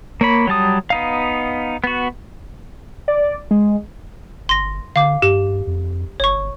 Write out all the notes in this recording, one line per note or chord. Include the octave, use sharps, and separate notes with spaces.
A#3 C#5 B5
F#3 G3 A5 D#6
B3 D#4 F5
B3 F#4
D5
G#3
G1 C6 A#6
D3 F5 D6
G2 G4
F2
G1 C#5 C#6